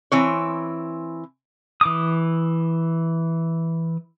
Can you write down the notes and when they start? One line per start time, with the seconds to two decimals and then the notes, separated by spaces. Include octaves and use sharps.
0.12 E3 C4 C#5
1.81 E3 D6 D#6